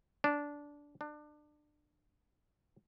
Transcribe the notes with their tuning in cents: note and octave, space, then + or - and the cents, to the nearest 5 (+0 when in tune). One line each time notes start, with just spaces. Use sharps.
D4 -10
D4 +30